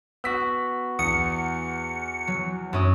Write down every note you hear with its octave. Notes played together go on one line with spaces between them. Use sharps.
B3 F#4 E6 B6
E2 D#6 C#7
F#3
F#2 C#4 D#6